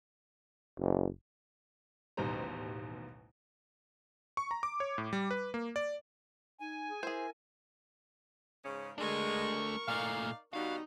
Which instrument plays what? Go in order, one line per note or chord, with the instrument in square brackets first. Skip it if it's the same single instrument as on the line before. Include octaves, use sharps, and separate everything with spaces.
[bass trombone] F#1
[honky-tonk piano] A1 D#2 B2 G3 C5 A#5
[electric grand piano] C#6
A#5
D6
C#5
A2
G3
B4
A#3
D5
[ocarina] D#4 [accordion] G#5
[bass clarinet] G#4
[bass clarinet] E4 [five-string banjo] G#4 C5 [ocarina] A#4
[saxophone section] G#2 C#3 C#4
[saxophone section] G#3 [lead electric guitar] A3 D4 [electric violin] A#4 C#6
[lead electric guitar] A#2 A3 [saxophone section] D#4 D5 F5
[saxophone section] B2 G3 F#4 [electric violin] D#4 [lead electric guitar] F5